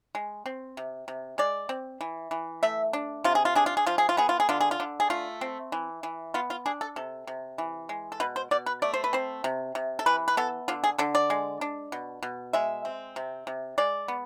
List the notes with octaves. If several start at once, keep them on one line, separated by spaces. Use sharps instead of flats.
G#3
C4
C3
C3
G#3 D5
C4
E3
E3
A3 E5
D4
C3 F4
G#4
F4
D4 G#4
F4
G#4
F3 F4
G#4
F4
B3 G#4
F4
G#4
D3 F4
G#4
F4
D3
G#4
A3 F4
C4
E3
E3
B3 F4
F4
D4 G#4
A4
C3 A4
C3
E3
G#3
A4
B2 B4
C5
B2 D5
B4
A3 D5
C5
B4
C4 C5
C3
C3
A4
E3 B4
B4
B3 A4
D3 F4
G#4
D3 A4
D5
G#3
D4
B2
B2
G#3 E5
C4
C3
C3
G#3 D5
B3